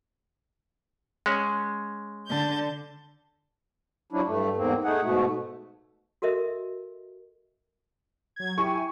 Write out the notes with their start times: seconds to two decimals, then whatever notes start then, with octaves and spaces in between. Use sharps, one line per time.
1.26 G#3 C#4
2.27 D3 A5 G6
4.12 F3 F#3 C#4 D4 E4
4.27 G2 A3
4.57 E2 G#2 A#3 C4
4.84 A3 D#4 G#4 F#5
5.01 G#2 B2 A3
6.22 F#4 A4 A#4 D#5 E5
8.36 F#3 G#6
8.58 E4 G4 G#5 C#6